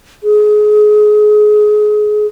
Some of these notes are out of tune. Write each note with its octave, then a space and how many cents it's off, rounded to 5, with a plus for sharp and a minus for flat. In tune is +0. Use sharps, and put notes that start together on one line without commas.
G#4 +25